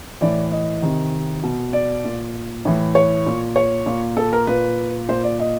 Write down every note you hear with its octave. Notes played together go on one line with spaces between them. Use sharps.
A2 E3 D5
D#5
C3 D#3
B2
D5
A#2
A2 E3
C#5
A#2
C#5
A#2
A4
A#4
A#2 B4
A#2 C5
D5
D#5